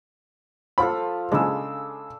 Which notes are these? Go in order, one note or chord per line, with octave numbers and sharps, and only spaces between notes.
F3 F4 A4 B5
C#3 G#3 D4 E6